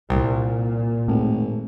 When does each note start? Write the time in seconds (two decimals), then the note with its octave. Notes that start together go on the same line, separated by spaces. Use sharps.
0.10 C2 A#2
1.08 G#1 A2